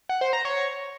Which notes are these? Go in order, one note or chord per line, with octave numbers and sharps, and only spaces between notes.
F#5
C5
A#5
C#5